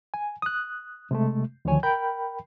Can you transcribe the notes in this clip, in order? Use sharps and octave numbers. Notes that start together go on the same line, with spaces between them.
G#5
D#6 F#6
C3 G#3 A3
D2 D3 D#3 F3 C#5 G#5
A#4 G5 B5 G6